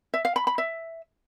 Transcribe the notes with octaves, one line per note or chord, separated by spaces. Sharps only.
E5
F5
B5
B5
E5